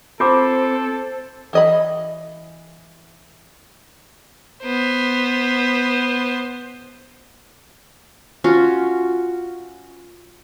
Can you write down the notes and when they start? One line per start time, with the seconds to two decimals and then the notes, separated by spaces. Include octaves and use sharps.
0.20 C4 F4 A4 C5 D6
1.53 E3 D#5 B5
4.64 B3 C5
8.44 C#4 F4 F#4